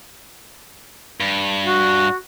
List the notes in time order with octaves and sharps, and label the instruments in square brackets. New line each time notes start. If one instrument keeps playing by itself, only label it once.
[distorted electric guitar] G2
[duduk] F#4